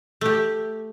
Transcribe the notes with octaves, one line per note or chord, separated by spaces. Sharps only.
A3 G4